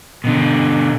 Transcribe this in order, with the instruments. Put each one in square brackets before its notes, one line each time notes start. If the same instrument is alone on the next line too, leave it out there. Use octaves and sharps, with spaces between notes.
[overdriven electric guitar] B2 D3